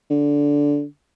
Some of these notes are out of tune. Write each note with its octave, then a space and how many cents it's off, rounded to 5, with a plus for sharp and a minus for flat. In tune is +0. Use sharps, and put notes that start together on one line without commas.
D3 -15